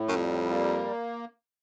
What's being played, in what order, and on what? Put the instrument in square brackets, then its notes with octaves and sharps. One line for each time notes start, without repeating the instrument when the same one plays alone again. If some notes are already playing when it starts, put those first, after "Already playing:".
Already playing: [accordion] A2
[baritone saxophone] F#2
[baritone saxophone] F2 [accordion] G3
[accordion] A#3